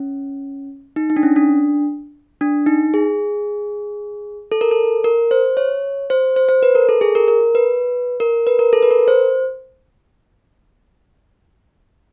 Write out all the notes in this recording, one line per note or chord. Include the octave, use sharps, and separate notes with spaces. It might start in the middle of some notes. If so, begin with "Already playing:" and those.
Already playing: C#4
D#4
D#4
D4
C#4
D4
D4
D#4
G#4
A4
A#4
A4
A#4
C5
C#5
C5
C5
C5
B4
A#4
A4
G#4
A#4
A#4
B4
A#4
B4
A#4
A4
B4
A#4
C5